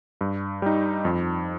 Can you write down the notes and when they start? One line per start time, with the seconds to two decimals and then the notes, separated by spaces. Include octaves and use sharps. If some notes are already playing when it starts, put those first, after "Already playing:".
0.21 G2
0.62 G3 D#4
1.05 F2